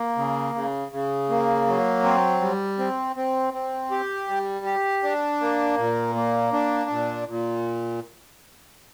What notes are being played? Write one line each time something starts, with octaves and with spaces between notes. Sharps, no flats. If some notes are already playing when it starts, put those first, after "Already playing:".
Already playing: A#3
C#3
C#3
C#3
A#3
F#3
C4
G3
C4
C4
C4
G4
G3
G4
D4
A#3
A#2
A#3
D4
A#2
A#2